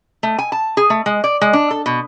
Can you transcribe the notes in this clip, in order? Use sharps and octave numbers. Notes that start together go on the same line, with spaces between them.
A3
G#5
A5
G#4
A3
G#3
D5
G#3
D4
A4
B2